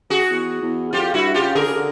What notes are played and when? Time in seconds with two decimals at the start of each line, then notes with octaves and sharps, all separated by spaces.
0.10 F#4 G#4
0.30 E2
0.62 E2
0.93 F2 F4 G4
1.13 G2 E4 F#4
1.34 C#3 F4 G4
1.55 D3 G#4 A#4
1.66 C#3
1.75 D3